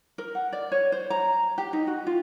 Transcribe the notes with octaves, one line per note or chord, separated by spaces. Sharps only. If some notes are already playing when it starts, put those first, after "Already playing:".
A#4
F#5
D5
C#5
C5
A#5
G4
D#4
F#4
F4